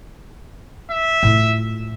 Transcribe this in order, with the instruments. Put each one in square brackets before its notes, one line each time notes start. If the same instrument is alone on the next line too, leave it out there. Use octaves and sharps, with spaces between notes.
[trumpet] E5
[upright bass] A2 F4